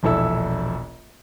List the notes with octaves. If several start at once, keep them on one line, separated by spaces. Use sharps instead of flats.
E1 A#1 E4 A4 E6